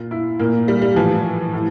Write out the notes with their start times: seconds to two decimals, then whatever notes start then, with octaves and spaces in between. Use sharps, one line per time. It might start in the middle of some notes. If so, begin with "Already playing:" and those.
Already playing: A#2 F4
0.11 E4
0.39 A#2 A#3
0.68 G3
0.81 G3
0.96 A2 E3 F3
1.53 A2